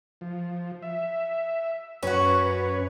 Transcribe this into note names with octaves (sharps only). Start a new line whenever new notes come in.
F3
E5
F#2 C#4 F#4 B4 C#5